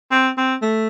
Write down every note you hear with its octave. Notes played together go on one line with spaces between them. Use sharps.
C4
C4
A3